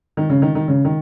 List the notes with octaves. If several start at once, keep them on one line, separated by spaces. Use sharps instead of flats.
D#3
C#3
D#3
D#3
C#3
D#3